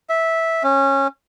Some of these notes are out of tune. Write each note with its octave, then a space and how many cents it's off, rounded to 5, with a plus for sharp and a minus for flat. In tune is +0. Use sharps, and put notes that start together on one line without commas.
E5 -10
C#4 -20